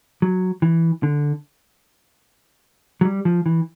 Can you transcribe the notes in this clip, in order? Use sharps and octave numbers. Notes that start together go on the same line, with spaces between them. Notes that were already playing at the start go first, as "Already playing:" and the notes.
F#3
E3
D3
F#3
G3
F3
E3